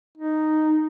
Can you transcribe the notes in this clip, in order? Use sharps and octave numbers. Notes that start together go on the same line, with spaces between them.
D#4